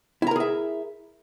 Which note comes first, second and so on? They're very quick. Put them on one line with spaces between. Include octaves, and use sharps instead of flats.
E4 A#5 A#4 G#4 E5